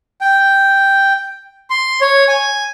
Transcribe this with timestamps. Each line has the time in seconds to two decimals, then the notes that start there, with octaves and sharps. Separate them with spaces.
0.21 G5
1.70 C6
2.01 C#5
2.28 G#5